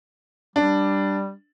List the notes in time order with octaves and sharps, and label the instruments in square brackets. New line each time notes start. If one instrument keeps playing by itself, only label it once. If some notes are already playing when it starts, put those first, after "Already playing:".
[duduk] G3 [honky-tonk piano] D4